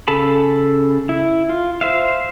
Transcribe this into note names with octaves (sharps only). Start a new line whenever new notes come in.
C#3 A4 A5 B5
E4
F4
C5 E5 F5